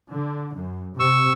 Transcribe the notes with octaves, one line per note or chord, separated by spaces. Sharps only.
D3
F#2
C3 C#6 E6